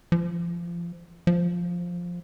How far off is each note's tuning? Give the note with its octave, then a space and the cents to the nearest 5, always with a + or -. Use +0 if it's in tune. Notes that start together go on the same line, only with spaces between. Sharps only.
F3 -25
F3 +5